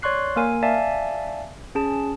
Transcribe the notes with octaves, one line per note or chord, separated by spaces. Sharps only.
C#5 D5 C6 C#6 F#6 C7
A#3 A#4 G#5
D5 E5 F5 G#5 A5
C#4 G#4 A5